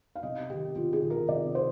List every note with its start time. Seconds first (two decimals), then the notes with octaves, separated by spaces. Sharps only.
0.15 F5
0.23 C2 D#5
0.50 C3 D#3 G4
0.75 C2 F4
0.93 G#4
1.03 C3 D#3
1.10 A#4
1.28 C2 D5
1.54 C3 C5